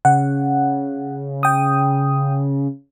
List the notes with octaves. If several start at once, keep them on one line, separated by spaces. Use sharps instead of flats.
C#3 F#5
G5 D#6